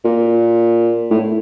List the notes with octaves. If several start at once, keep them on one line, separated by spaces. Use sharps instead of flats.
A#2
A2